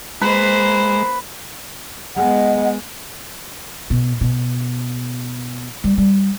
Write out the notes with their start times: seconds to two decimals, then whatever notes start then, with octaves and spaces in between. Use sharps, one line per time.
0.22 G#3 A#3 B4 C5
2.16 G#3 B3 D#5 F#5
3.90 B2
4.21 B2
5.84 G3
5.98 G3